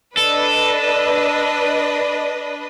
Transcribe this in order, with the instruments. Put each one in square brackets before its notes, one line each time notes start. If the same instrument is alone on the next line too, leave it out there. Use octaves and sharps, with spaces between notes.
[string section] D4 B4 D#5 [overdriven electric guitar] A4